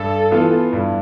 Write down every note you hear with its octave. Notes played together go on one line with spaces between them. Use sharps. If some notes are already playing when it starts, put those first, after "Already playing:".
Already playing: G2 A4
E3 B3 F4
G2